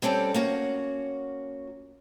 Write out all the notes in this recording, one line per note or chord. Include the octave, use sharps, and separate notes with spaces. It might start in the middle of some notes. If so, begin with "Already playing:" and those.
G3 C4 C#4 A4 D5
A#3 C#4 F#4